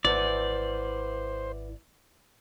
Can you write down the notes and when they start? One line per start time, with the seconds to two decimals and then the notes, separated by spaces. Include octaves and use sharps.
0.05 G#1 E4 B4 C5 D5 F#5